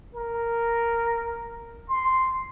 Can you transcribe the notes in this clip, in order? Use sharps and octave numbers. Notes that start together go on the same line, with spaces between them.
A#4
C6